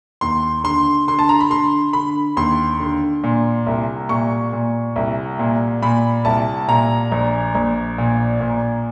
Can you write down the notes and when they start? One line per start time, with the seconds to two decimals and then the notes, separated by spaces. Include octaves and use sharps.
0.21 D#2 C6
0.64 D3 C6
1.08 D3 C6
1.19 A5
1.29 A#5
1.40 B5
1.50 D3 C6
1.93 D3 B5
2.37 D#2 C6
2.80 D3
3.23 A#2
3.66 C2
4.09 A#2 C#6
4.53 A#2
4.96 C2
5.39 A#2
5.82 A#2 B5
6.25 C2 A5
6.68 A#2 A#5
7.12 A#1
7.55 A#1
7.98 A#2
8.41 A#2